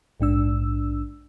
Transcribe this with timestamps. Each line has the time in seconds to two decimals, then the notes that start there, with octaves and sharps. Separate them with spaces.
0.20 A#1 G#2 D4 E6